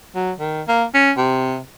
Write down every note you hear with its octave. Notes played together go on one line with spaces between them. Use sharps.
F#3
D#3
A#3
C#4
C3